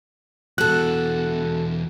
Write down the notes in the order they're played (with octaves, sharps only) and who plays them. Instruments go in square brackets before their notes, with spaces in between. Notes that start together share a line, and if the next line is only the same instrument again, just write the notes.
[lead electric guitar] E2 B2 [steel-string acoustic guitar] F#4 A4 [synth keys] F#6